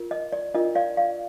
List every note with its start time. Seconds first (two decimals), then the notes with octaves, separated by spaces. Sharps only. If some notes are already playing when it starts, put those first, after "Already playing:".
Already playing: F4 A#4
0.11 D#5
0.33 D5
0.54 D4 F4 A#4 D#5
0.75 D5 F5
0.97 D5 F5